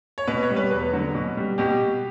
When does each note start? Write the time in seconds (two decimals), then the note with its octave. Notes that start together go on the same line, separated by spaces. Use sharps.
0.18 C#5
0.28 B2 B4
0.43 C#5
0.50 G3
0.56 B4
0.71 E2 B4
0.93 D3 F#3
1.15 B2
1.37 G3
1.58 B2 G4